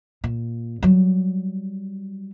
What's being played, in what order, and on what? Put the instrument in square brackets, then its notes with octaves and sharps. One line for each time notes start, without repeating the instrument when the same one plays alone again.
[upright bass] A#2
F#3 G3